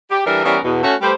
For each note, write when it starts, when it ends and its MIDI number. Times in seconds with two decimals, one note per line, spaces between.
0.11 0.25 67
0.26 0.43 52
0.26 0.43 55
0.26 0.43 62
0.26 0.43 69
0.26 0.43 70
0.45 0.58 52
0.45 0.58 55
0.45 0.58 59
0.45 0.58 61
0.45 0.58 70
0.45 0.58 73
0.64 0.80 40
0.64 0.80 47
0.83 0.95 57
0.83 0.95 61
0.83 0.95 66
1.02 1.14 55
1.02 1.14 57
1.02 1.14 67
1.02 1.14 71
1.02 1.14 72